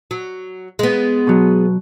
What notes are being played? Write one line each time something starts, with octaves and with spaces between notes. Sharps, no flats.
F#3
G#3 B3
B2 F#3